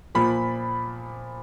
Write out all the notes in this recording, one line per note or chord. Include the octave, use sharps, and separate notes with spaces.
A#2 F3 A#3 B5